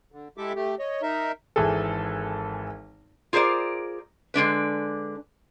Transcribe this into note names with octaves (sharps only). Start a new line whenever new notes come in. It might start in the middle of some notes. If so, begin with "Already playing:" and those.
D3
G#3 E4 G4 A4 E5 D6
A3 G4
C#5 D#5
D#4 A#4 E5
G#1 E3 G#4 A4
F4 G#4 A#4 C5 D5
D3 G#3 D4 B4